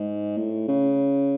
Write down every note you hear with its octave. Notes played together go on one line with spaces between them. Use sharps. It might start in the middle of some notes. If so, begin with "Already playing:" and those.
Already playing: G#2
A2
C#3